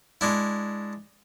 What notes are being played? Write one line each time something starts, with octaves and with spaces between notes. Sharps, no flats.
G#3 D4 E4